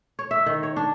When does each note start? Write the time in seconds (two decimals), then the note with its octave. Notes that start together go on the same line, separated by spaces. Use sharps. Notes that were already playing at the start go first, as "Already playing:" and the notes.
0.19 C#5
0.31 E5
0.46 D#3
0.63 C#5
0.77 D4